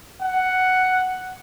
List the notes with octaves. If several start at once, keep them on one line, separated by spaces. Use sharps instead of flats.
F#5